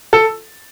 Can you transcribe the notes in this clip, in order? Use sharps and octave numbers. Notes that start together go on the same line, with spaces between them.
A4